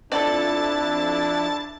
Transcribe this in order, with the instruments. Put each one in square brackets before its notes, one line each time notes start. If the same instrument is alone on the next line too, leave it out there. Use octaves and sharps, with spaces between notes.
[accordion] F2 E4 [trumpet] D4 [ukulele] A4 D5 [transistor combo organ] A5